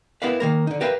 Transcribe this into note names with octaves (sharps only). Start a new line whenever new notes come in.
B3 E4 G4 A#4 B4 F5
D#3 A#3 A#4
D3 D#4
G4 A#4 B4 E5 F5